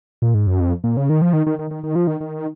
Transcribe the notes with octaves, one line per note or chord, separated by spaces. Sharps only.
A#2
G#2
F#2
F2
A#2
C#3
D#3
F3
D#3
D#3
D#3
D#3
D#3
F3
D#3
D#3